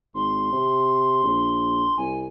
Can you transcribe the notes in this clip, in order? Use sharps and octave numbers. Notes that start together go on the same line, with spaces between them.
G#1 C6
C3
A#1
C2 G#5